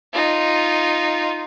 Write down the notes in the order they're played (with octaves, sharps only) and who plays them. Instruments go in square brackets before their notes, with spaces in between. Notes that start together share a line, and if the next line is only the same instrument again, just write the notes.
[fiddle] D#4 F4